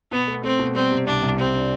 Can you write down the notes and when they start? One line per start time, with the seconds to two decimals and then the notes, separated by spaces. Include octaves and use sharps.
0.11 B2 B3
0.27 A3
0.44 A3 C4
0.59 B2
0.75 G3 C4
0.91 C3
1.06 C2 D4
1.22 C2
1.38 C4 G4
1.54 D4